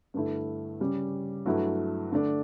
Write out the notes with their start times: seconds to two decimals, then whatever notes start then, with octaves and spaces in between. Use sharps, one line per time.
0.14 G2 D3 A3 E4
0.80 C#3 G3 C#4
1.46 G2 F#3 A3 E4
2.12 D3 A3 D4